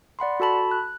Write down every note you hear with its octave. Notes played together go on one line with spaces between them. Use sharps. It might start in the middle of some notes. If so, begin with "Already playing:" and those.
D5 F#5 B5 C6
F#4 A4 A5 B5
F#6